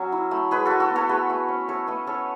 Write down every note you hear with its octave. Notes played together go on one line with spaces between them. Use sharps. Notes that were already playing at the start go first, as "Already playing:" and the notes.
Already playing: F#3 C#4
E4
A3
G#3 G#4 B4
G#3 F#4 A4
F#4 A4
B3
A4 C#5
A3 G#4 B4
A3
C#4
A3 A4 C#5
A3 B4 D#5
C#4 A4 C#5